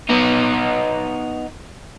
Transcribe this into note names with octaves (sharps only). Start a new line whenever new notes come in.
B3 D#4